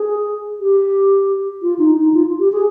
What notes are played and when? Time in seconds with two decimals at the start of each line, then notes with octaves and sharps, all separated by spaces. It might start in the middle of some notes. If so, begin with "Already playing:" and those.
Already playing: G#4
0.60 G4
1.62 F4
1.79 D#4
1.96 D#4
2.14 F4
2.39 G4
2.52 G#4